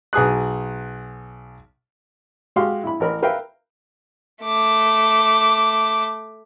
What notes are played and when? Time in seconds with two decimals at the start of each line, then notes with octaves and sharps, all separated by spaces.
0.13 B1 G#4 D#6 F#6
2.56 G#3 F#4 G4 F5 C6
2.84 E4 B5
3.00 A1 A#4 B5
3.23 A#4 B4 E5 F5 G5
4.42 A3 D6